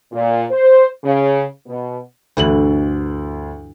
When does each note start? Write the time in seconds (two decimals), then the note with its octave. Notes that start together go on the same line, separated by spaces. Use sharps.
0.12 A#2
0.50 C5
1.04 C#3
1.67 B2
2.37 D2 G2 D3 E3 F#7